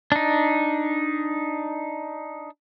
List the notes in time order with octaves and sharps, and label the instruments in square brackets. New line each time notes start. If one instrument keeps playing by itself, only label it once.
[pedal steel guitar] D4 D#4